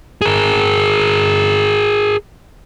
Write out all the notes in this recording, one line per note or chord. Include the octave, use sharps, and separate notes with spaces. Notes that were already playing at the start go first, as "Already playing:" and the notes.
G#4 A#4